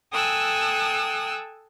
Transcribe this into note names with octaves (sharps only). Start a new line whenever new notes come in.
A4 G5 G#5 D#6 E6 F#6